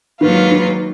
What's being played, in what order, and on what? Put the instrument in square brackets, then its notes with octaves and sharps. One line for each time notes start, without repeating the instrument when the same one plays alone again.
[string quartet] G#2 F#3 A#3 F4 B4 [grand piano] D#3
[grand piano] D#3